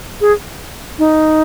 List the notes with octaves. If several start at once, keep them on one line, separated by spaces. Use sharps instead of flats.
G#4
D#4